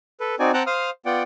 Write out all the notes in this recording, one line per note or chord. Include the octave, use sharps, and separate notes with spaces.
A4 B4
C4 D#4 F#4 D5 G#5
C4 F#5 G5 A5 A#5 F#6
C5 F5 D#6 F6
B3 F4 D5 F#5 G5